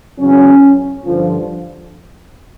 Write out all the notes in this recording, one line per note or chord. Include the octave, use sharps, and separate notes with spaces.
E2 C#3 F#3 C#4
G2 D3 F3